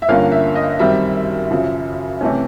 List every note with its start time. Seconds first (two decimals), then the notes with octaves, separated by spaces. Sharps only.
0.02 E5
0.08 G2 D3 F3 A#3 C#4 F5
0.32 E5
0.55 D#5
0.79 F#2 D#3 G3 C4 E5
1.50 F#2 C#3 F3
2.21 C3 E3 A3 C#4